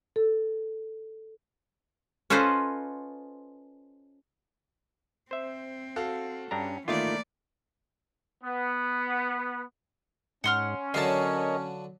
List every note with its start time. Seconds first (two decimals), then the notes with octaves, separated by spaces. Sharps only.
0.16 A4
2.30 C#4 F4 A4 B4 C5 D#5
5.31 C4 C5 E5
5.96 F#4 A4 F5
6.51 G2 C#4 D4 A#5
6.88 D#3 E3 A3 A#3 F4 D5
8.44 B3
10.44 G#2 C#4 F#5 C6 F6
10.94 D3 F#3 F#4 A#4 C#5 D#5 F5 A5